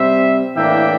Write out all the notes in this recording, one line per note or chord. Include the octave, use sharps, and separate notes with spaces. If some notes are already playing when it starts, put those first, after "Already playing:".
Already playing: C3 G3 C4 C5 E5
A2 E3 A#3 D4 E5 G5